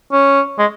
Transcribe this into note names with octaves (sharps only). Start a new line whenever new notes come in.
C#4
G#3